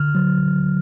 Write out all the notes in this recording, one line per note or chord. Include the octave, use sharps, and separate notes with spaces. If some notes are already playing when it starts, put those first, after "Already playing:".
Already playing: D3 F6
F#3